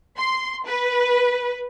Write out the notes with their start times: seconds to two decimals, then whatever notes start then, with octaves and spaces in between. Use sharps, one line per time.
0.17 C6
0.66 B4